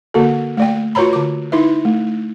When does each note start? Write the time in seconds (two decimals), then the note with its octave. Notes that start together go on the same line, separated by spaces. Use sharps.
0.14 D3 A#3 F#4 A4
0.57 A3 D5 G5
0.95 F4 F#4 B4 C#5 A#5 B5
1.13 D3 D6
1.52 D#4 E4 B4 E5
1.85 A3